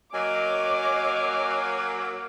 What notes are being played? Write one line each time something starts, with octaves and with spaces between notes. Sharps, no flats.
F#3 A#3 C#5 D#5 G#5 D6